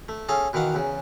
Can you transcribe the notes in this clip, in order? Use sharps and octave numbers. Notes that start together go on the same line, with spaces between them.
A3
C#4 G#4 A4 F5
B2 D#3 E3 F5 F#5
E2 C#3